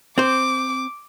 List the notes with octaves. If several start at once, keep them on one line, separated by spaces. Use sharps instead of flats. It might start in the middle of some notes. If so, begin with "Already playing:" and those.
C4 C5 D6